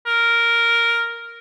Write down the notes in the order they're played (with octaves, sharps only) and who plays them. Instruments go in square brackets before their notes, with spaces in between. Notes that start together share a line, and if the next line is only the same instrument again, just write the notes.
[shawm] A#4